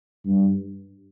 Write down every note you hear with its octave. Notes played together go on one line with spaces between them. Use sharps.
G2